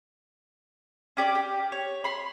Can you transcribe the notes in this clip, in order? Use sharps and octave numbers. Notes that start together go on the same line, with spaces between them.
C#4 G4 D5
G4
C#5
B5 C6